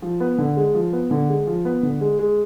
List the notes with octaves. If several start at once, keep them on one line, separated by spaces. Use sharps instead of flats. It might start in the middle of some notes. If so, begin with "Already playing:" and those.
F3
B3
D3
G#3
F3
B3
D3
G#3
F3
B3
D3
G#3
G#3